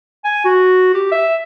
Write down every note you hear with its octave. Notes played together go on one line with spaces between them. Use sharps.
G#5
F#4
G4
E5